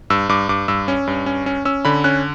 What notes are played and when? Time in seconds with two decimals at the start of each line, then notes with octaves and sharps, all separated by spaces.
0.10 G2 E6
0.29 G2 D6
0.49 G2 D6
0.68 G2 E6
0.88 C#4
1.07 G2
1.26 C#4
1.46 C#4
1.65 C#4 E6
1.85 D3 B5
2.04 C#4 F#6